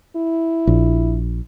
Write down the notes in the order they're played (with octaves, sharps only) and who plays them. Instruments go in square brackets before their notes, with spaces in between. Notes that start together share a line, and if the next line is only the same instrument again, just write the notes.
[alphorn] E4
[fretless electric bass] A#1